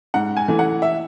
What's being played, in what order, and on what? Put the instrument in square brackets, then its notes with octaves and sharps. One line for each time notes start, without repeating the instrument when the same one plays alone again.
[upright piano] G#2 F#5
G#5
E3 A3
F#5
E5